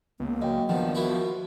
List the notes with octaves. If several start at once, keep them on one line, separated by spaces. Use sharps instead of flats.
C#2 A#3 B3
F#2 D#5 G5
G2 D#3 F3 B3 F#5
A#3 E4 F#4